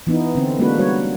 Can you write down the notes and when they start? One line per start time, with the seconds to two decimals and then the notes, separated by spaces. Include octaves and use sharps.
0.07 E3 B3 D#4
0.35 D3 C4
0.59 G#3 A#3 B3 D4 F#4 B4
0.78 G3 F#4 C#5